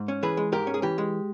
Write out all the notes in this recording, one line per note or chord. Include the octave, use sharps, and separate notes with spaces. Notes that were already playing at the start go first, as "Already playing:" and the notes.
Already playing: G#2
C#4
E3 G#4 B4
G#3
G#2 G4 A#4
C#4
G#4
E3 G4
G#3